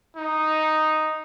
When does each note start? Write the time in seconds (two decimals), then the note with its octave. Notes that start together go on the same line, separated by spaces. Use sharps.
0.17 D#4